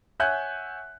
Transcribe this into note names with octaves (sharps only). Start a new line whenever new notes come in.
C#5 E5 F#5 G#5 F#6 G6